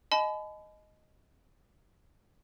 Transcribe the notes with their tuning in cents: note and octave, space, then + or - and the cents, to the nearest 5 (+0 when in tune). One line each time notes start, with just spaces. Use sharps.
D#5 +0 G#5 +45 B5 +35